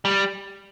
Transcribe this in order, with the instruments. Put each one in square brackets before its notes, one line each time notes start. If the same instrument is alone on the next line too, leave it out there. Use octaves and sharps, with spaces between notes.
[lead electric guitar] G3